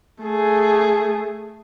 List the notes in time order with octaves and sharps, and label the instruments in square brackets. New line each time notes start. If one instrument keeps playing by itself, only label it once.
[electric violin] A3 G#4